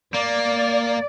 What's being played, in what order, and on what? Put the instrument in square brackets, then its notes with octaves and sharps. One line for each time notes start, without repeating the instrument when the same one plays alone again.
[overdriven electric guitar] A#3 [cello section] D5